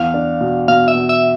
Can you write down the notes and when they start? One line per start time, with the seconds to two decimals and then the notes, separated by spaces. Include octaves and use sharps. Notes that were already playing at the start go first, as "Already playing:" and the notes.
Already playing: E2 F5
0.14 D4
0.41 B2
0.68 B2 F5
0.88 E5
0.95 B2
1.09 E5